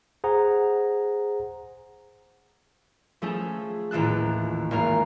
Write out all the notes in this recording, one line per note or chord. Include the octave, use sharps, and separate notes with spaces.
G#4 C5 F#5 A#5
F3 A3 C#4 G#4 A4
D#1 A1 F4 A4 F#6
G#1 A#3 F4 F5